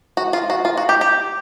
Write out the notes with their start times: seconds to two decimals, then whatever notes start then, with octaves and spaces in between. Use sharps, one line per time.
0.17 F#4
0.33 F4
0.50 F#4
0.65 F4
0.77 F#4
0.89 G4
1.01 G4